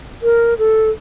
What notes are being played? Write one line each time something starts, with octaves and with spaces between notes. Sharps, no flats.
A#4
A4